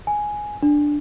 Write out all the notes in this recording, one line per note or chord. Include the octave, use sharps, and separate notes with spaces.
G#5
D4